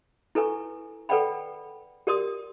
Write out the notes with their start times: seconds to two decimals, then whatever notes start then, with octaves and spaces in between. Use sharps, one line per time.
0.35 E4 A4 B4 G#5 C#6
1.09 A4 B4 D5 F#5 G5 B5
2.07 G4 A#4 D5 C6 D#6